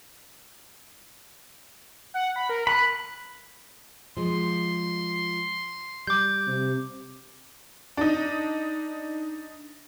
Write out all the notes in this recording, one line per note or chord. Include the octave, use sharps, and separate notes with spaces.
F#5
B5
A#4
B5 F#6
F3 G#3 C6
G3 D6 G6
C3
D4 D#4